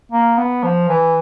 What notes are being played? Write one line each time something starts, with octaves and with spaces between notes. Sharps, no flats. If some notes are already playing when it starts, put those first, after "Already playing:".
A#3
B3
F3
E3